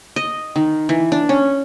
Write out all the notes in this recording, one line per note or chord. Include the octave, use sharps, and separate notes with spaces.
D#5
D#3
E3
D4
C#4